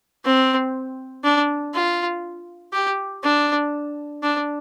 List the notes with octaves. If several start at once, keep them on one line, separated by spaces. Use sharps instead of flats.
C4
D4
F4
G4
D4
D4